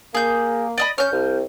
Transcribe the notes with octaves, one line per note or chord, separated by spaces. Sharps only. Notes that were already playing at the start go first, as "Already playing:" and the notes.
A#3 G#4 G6
D5 D#5 B5
C#4 F6 G6
C2